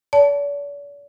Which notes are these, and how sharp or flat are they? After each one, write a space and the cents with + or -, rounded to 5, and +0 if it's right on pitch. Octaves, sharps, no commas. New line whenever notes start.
D5 -45 A5 +0